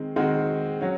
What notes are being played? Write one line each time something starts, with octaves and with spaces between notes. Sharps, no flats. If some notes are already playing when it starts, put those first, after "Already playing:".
Already playing: D#3 G#3 C4
D#3 G#3 C4 F#4
F#3 C#4